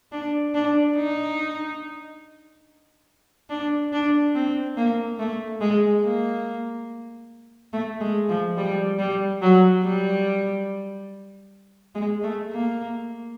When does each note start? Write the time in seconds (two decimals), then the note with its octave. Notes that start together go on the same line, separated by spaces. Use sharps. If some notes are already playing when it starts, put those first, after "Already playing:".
0.12 D4
0.54 D4
0.96 D#4
3.50 D4
3.92 D4
4.35 C4
4.77 A#3
5.19 A3
5.61 G#3
6.03 A#3
7.73 A3
8.01 G#3
8.29 F3
8.57 G3
8.99 G3
9.42 F#3
9.83 G3
11.95 G#3
12.24 A3
12.51 A#3